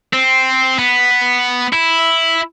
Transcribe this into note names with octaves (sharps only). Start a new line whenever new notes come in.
C4
B3
E4